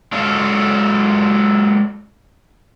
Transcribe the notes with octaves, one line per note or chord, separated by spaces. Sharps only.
F#3 G#3 F4 A4 C#5 F5